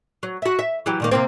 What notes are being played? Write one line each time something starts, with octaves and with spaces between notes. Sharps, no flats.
F#3
F#4 E5
E5
E3 F#3 G4
A#2 D#3 A#3
C3 A#3 C4